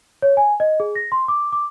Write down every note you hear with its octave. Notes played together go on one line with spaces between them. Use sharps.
C#5
G#5
D#5
G#4
A#6
C6
D6
D6